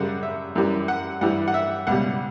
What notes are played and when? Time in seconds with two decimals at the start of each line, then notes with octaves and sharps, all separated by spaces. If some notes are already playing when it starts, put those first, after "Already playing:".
Already playing: F#2 C#3 G3 F#5
0.23 E5
0.56 F#2 E3 G3
0.88 F#5
1.21 G2 E3 G3 F#5
1.48 F#5
1.54 E5
1.87 C#2 B2 G3 F#5